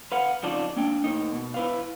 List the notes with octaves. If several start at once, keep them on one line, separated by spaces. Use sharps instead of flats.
B4 F5 F#5
F2 C#3 D#4 F4 D5 A5
A#3 D4 G5
A2 A#3 D#4
B2
E4 B4 F5